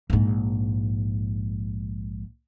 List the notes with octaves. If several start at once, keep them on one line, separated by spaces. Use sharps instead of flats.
A#1 G#2